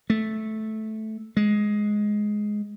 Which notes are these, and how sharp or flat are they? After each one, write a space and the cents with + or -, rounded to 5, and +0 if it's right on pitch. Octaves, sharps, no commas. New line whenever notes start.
A3 -10
G#3 +10